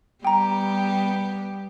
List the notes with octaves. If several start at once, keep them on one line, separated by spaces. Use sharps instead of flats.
G3 B3 G4 G5 A#5